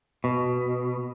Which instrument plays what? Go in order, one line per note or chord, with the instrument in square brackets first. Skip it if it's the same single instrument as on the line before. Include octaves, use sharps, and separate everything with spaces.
[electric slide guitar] B2